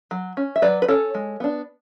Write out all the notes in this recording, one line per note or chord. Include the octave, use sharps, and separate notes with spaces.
F#3
C#4
E5
F#3 B4 D5
B4
C#4 A4 C#5
G#3
B3 D4